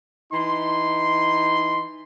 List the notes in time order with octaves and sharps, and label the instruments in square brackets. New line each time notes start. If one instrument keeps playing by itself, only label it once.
[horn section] E3 D#4 C6